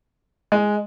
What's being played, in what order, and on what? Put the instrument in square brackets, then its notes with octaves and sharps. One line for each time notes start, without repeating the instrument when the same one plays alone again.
[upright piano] G#3